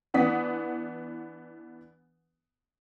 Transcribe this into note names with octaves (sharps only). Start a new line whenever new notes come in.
E3 B3 D4 F#5 D#6 B6